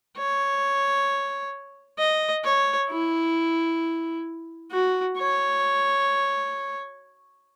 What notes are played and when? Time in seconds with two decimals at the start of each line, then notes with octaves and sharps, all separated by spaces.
0.17 C#5
1.99 D#5
2.44 C#5
2.90 E4
4.71 F#4
5.17 C#5